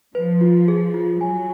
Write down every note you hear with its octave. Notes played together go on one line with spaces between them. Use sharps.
F3 B4
F4
G#4
F4
F#3 G#5